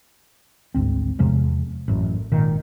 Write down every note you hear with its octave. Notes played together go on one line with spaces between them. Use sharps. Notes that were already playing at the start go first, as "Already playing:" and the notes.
G#1 D2 C4
E2 C3 F3 G#3
A1 F#2
G#1 A#2 D#3